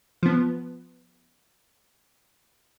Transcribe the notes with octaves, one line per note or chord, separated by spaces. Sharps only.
F3 B3